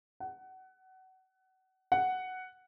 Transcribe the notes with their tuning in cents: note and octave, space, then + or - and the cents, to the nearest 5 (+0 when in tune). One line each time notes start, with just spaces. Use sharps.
F#5 +25
F#5 +5